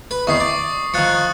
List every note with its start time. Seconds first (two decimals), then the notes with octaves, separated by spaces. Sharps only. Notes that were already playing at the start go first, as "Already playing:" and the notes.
0.11 B4
0.27 E2 D#3 C#6 D#6 C7
0.40 D5
0.94 D#3 F3 F#6 A6 C#7